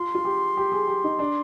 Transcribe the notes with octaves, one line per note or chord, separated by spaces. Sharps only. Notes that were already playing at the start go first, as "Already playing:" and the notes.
Already playing: F4 C6
F4
G4
G4
G#4
G4
D#4
D4